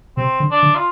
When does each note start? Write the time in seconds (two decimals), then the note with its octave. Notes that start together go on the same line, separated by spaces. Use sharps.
0.17 C3 C4
0.40 D3
0.51 D4
0.62 D3
0.75 F4